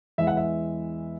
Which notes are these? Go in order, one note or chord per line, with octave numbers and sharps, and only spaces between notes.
E2 E3 G#3 E5
F#5
E5